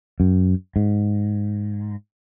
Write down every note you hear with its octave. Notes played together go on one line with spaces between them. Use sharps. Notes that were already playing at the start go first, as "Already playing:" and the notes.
F#2
G#2